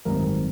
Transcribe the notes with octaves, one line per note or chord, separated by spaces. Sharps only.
G#1 F#2 D#3 G3 C4 A#4